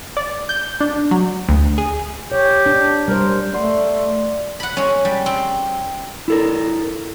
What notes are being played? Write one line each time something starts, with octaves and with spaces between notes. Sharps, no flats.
D5
G6
D4
F#3
D2
G#4
G4 C#5
D4
G3 A#4 C5
A3 D5 F#5 C6
F#5 B5
G#3 C#4
G3
C4
E4 A4 A#4